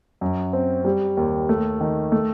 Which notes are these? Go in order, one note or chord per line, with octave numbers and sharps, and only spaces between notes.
F#2
C4
G3
D#2
A3
D#3
A3